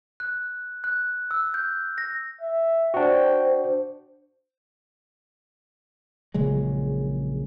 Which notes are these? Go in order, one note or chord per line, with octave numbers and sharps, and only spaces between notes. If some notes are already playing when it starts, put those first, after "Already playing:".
F#6
F#6
E6
G6
A#6
E5
D4 F#4 C5 G5
A#1 C#3 F#3 G#3